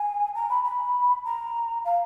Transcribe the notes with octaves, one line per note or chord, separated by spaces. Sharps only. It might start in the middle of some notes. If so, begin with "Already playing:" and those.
Already playing: G#5
A#5
B5
B5
A#5
F5